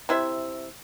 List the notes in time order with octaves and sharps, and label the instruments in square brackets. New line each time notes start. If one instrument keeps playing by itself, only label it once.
[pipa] C3 E4 C5 E5